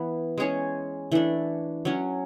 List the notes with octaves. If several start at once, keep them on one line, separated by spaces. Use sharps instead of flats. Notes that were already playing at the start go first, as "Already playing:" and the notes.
Already playing: E3 B3
G#3 C#4 G#4 C#5
E3 A3 D4
F#3 C#4 F#4